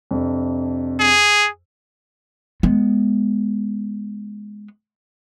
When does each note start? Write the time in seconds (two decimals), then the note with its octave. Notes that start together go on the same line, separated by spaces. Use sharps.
0.11 F2 C3 D4
1.00 G#4
2.63 G#3 B3